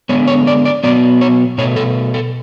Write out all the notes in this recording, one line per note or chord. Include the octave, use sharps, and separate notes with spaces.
D3 G#3 B3 C#5
C#5
D5
D5
B2 F#3 B3 D5
C#5
B2 A3 C#5
A4
A4